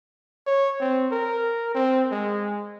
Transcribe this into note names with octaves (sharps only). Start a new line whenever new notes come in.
C#5
C4
A#4
C4
G#3